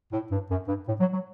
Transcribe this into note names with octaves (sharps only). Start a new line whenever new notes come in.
A2
G2
F#2
G2
A2
F#3
F#3